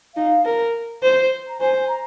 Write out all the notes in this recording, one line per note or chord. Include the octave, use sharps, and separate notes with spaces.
D#4 F5
A#4
C5
A#5
C5 G#5
A#5